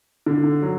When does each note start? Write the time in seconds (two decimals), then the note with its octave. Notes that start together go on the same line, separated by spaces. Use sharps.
0.26 D3
0.62 F#3